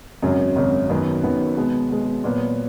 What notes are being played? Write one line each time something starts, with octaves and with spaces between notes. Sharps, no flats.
G#1 F#2 C#3 F#3
G#1 F#2 C#3 F#3
F#2 D#3 F#3 B3
F#2 D#3 F#3 B3
B2 G#3 B3
B2 G#3 B3
A#2 F#3 B3